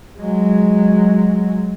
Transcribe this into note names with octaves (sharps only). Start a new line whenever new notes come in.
F#3 G#3